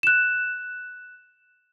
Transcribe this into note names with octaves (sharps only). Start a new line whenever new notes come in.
F#6 E7